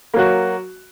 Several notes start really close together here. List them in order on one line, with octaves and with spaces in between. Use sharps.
A#3 F#3 F#4